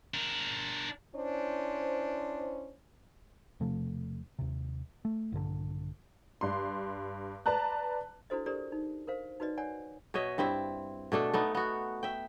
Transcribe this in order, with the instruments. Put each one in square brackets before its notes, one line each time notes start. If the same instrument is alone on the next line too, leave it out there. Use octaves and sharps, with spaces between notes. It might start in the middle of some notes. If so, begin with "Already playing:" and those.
[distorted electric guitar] D4 A#4
[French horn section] C#4 D4 E4 C5
[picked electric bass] E1 C3 F3 A3
D#2 C3
A3
A#1 G2 D3
[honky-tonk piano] G2 C6
B4 D5 A5 A#5 F#6
[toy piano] D4 E4 F#4 A4 C5 D#5
D4 G4 A4 A#4 C5 D5
D#4
A#4 C5 F5
D#4 F#4 B4 D5 D#5
C#5 D5 F#5 G#5
[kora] B2 C#5 D#5 E5
G2 C4 E4 E5
B2 A3 D4 A4
A3 B3 D#4
B3 F#4
E5 G5